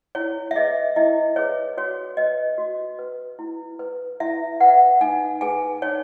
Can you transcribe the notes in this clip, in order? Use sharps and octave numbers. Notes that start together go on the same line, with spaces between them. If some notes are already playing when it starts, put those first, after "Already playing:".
E4 C#5
E5
G#4 B4 D#5
E4 D#5
G#4 B4 C#5
F#4 C#5
B4 D#5
F#4
B4
E4
B4
E4 E5
B4 F#5
D#4 G#5
G#4 B4 G#5
D#4 C#5